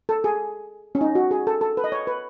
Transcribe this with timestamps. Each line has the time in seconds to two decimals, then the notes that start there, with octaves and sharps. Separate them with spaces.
0.09 A4
0.24 G#4
0.95 C#4
1.01 D#4
1.15 F#4
1.31 G#4
1.47 A4
1.61 A4
1.77 B4
1.84 D#5
1.92 C#5
2.07 B4